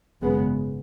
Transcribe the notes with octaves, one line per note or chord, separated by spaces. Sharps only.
G#1 F#2 C#3 G#3 B3